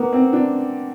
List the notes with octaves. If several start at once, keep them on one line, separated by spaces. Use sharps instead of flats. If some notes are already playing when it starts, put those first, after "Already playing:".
Already playing: A#3 B3
C4
D4